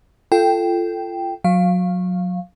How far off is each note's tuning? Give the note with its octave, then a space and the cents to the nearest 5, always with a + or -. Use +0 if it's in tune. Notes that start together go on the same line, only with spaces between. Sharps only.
F4 -20 A4 +0 G5 +0
F#3 -25 F5 +0